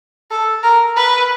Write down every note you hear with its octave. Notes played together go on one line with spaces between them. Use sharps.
A4
A#4
B4